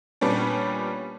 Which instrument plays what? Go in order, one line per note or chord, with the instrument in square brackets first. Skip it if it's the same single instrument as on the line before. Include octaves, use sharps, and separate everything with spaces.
[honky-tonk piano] A#2 G3 B3 C#4 D4